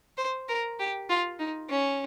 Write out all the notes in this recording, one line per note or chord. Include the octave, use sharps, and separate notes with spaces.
C5
A#4
G4
F4
D#4
C#4